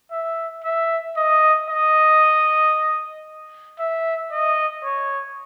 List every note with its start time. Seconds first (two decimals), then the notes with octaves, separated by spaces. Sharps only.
0.11 E5
0.64 E5
1.16 D#5
1.69 D#5
3.79 E5
4.31 D#5
4.84 C#5